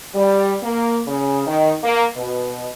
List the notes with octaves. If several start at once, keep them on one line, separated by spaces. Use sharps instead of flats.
G3
A#3
C#3
D#3
A#3
B2